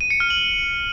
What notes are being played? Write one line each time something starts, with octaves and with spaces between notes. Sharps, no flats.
D#7
C#7
F6
F#7